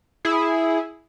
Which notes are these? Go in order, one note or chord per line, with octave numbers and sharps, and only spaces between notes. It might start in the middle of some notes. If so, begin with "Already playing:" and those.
E4 G#4